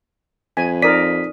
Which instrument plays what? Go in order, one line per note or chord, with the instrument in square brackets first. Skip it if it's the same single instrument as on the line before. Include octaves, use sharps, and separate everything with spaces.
[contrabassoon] F2 [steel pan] G#5 [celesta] B6
[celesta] D#4 D#6 D#7 [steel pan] A#4 D5 [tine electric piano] B6